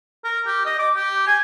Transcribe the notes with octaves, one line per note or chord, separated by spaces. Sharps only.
A#4
G4
D#5
D6
G4
G#5